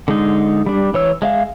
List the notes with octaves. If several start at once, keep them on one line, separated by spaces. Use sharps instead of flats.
D3 G#3 D#4
G3 D4
E3 C#5 E6
G#3 E5 F5